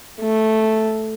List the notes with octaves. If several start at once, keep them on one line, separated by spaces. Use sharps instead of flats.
A3